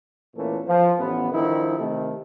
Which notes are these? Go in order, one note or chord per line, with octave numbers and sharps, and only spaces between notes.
E2 A#2 E3 A3 A#3 C#4
F3
A1 B3
D3 D#3 F3 G3 D#4 E4
C3 D#3 A3